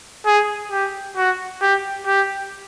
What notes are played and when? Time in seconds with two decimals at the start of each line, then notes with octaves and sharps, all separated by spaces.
0.26 G#4
0.72 G4
1.17 F#4
1.62 G4
2.07 G4